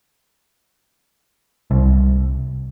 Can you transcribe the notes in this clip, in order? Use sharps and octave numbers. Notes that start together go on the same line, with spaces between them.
C2